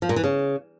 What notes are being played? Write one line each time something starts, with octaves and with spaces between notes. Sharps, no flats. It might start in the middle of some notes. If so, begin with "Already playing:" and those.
F3
A#2
E3
C#3